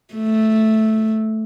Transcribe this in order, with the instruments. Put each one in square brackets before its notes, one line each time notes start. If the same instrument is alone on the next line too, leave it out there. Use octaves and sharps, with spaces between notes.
[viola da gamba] A3